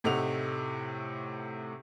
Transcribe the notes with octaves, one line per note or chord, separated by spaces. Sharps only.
A2 C3 A3 D#4 F#5 F7